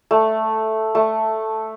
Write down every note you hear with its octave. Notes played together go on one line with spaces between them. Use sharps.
A3
A3